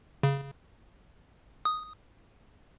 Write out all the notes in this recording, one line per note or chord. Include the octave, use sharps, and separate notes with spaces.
C#3
D#6